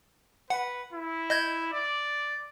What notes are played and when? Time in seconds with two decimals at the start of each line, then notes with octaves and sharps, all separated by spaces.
0.50 B4 F#5
0.93 E4
1.30 D#5 G6 G#6
1.73 D5